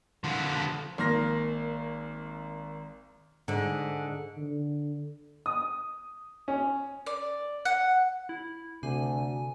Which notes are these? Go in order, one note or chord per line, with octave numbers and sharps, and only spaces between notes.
D3 F3
G#1 A#3 C6 F6 A#6
G#2 D3
D3
D#6
C#4
D5
F#5
E4
D2 C3 G#5